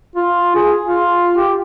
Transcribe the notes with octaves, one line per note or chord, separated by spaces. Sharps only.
F4
G#4
F4
G4